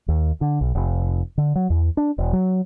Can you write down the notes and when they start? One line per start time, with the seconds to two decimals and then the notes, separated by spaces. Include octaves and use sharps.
0.08 D#2
0.41 D3
0.61 B1
0.75 F1
1.38 D3
1.55 F#3
1.70 E2
1.97 D4
2.18 E1
2.33 F#3